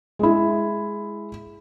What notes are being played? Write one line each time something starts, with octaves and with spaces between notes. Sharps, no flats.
G#3 E4